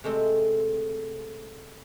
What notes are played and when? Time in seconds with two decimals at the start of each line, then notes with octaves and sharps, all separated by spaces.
0.04 C3 G#3 A3 C4